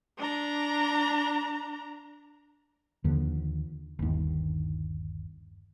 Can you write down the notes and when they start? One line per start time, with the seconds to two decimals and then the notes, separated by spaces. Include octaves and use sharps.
0.18 D4 A#5
3.04 D#2 D3 F3
3.99 G1 D#2